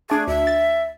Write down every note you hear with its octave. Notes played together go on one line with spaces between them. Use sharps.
A3 D4 G#4
D2 E5
A6